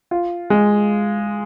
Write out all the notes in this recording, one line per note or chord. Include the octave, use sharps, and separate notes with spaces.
F4
G#3